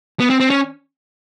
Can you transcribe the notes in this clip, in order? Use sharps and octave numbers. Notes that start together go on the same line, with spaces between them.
B3
C4
C4
C#4